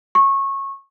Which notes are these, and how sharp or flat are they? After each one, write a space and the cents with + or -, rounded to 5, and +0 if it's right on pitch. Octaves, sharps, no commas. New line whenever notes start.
C#6 -20